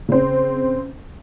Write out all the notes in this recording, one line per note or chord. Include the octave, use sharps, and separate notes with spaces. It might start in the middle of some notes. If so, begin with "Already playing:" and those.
C#3 C4